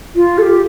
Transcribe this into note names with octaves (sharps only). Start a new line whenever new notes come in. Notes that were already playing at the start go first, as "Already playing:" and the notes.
F4
A4
G4